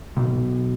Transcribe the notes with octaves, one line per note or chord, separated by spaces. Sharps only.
B1